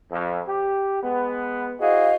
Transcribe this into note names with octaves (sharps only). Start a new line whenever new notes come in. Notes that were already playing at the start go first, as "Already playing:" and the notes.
F2
G4
G#3 B3
E4 F#4 G#4 C5 D#5 F5